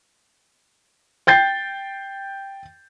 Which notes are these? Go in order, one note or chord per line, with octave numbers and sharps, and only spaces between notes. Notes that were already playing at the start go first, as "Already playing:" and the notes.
G5 G6 A6 C7